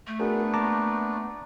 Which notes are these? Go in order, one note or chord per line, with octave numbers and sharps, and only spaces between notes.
A3
B3 D4 F#4 G#4 A#4
A#3 A5 A#5 D6